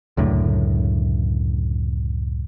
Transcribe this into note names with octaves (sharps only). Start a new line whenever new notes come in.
C#2 F#2 A2 D3